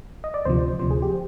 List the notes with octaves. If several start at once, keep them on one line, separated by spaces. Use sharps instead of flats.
D#5
D5
D2 C3 F3 C5
D2 C3 F3 C5
G#4
G4